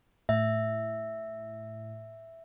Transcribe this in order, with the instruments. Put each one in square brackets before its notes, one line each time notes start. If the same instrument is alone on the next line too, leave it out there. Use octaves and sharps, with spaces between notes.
[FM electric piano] A2 [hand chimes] E5